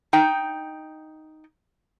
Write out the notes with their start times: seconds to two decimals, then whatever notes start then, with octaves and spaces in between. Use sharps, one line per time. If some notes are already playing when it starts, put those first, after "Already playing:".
0.13 D#4 G5